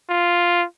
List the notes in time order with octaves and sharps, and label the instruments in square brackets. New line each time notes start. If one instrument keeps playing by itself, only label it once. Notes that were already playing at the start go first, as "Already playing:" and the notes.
[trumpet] F4